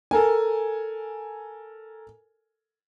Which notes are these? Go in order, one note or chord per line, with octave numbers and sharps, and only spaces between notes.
A4 A#4 G#5